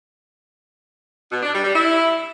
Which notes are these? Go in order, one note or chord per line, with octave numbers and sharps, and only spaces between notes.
B2
D4
G3
G3
E4